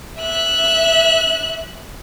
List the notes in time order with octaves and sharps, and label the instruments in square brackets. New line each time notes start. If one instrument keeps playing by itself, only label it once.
[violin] E5 F#6